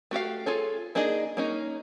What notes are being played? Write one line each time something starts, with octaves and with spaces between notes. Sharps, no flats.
A3 F#4 G4 F5
F4 G#4 A4 C#5
A#3 D4 D#4 G#4 D#5
A#3 C#4 D#4